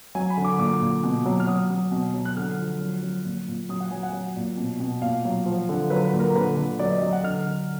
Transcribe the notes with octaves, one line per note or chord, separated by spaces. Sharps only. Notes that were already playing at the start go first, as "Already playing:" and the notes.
F#3 G#5
B5
D3
D6
A#2 D6
A#2
B2
F#3
F6
F#3 D#6
F#3
B2
F#3
F#6
D3 F6
F3
F#3
F#3
A#2
A#2
F#3 D#6
F#5
F#3 G#5
F#5
F#3
A#2
B2
B2
A#2 F5
F#3
F3
D3
F#3 B4
B4
A#2
A#4
D3 B4
D3
F#3 D5
D#5
F#3 D#5
F#5
D3 F6
D3